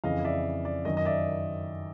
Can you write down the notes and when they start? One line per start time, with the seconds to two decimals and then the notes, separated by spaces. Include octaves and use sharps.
0.04 F2 C#3 E3 D#5 F5
0.25 D5 E5
0.65 D5
0.85 F#2 D#3 D#5
0.97 D#5
1.05 D5 E5